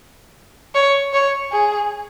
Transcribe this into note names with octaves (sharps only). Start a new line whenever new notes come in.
C#5
C#5
G#4